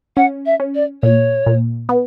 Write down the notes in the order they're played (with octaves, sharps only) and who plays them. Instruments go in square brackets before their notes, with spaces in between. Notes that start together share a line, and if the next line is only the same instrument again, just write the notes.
[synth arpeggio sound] C#4 [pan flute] F#5
[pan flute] E5
[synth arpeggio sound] C#4
[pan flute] D5
[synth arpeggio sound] A#2 [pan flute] C#5
[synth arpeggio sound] A#2
B3